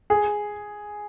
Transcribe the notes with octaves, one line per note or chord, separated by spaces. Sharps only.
G#4